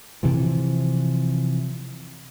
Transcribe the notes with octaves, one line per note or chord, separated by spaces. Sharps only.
C3 E3 F3